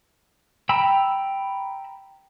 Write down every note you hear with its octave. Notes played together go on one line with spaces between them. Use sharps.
G5 A#5 B5 E6